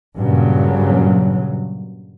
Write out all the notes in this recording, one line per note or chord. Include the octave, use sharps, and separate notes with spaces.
G2 A#2 C#3 F#3